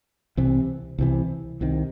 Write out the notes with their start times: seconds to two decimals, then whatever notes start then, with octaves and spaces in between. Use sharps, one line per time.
0.37 C2 C3 E3
0.98 C2 C3 E3
1.61 C2 C3 D#3